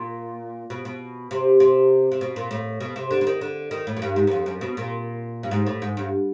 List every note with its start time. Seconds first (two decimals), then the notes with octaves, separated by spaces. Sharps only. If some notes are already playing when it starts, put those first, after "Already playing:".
Already playing: A#2
0.70 B2
0.85 B2
1.31 C3
1.60 C3
2.12 C3
2.21 B2
2.36 A#2
2.51 A2
2.80 B2
2.96 C3
3.11 D3
3.21 D3
3.27 D#3
3.41 D3
3.71 D#3
3.87 A2
3.97 F#2
4.02 G2
4.16 G#2
4.27 F#2
4.31 F2
4.46 F#2
4.61 B2
4.77 A#2
5.43 G2
5.51 G#2
5.66 A2
5.82 G#2
5.97 G2